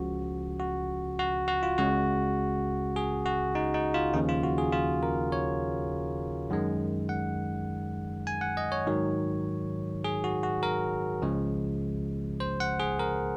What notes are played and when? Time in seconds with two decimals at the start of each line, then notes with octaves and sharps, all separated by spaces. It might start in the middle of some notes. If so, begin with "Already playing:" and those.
Already playing: C#2 C#3 F3 F#4
0.60 F#4
1.19 F#4
1.48 F#4
1.63 F4
1.78 C#2 C#3 G#3 F#4
2.96 G#4
3.26 F#4
3.55 D#4
3.74 D#4
3.94 F4
4.14 D#2 C#3 F3 D#4
4.29 F4
4.43 F#4
4.58 G#4
4.72 F4
5.03 A#4
5.32 C#5
6.50 F#2 D#3 G#3
7.09 F#5
8.27 G#5
8.41 F#5
8.57 D#5
8.72 C#5
8.87 G#2 D#3 F#3
10.04 G#4
10.24 F#4
10.43 F#4
10.63 A#4
11.22 C#2 C#3 F3 G#3
12.40 C5
12.60 F#5
12.80 G#4
12.99 A#4